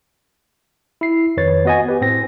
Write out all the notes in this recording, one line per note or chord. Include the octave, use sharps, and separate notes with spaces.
E4 C7
F2 D#3 B4 C#5 A6
B3 F#4 D#5 F#5 G#5
G4 B4
A2 C4 A#6